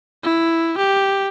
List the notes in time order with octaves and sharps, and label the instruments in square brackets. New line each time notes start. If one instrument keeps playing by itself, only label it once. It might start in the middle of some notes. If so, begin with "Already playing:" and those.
[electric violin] E4
G4